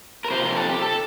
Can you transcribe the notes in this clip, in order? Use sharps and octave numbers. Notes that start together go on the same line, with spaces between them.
A#4
C3 F3 C5
A#4
A4
G4
A4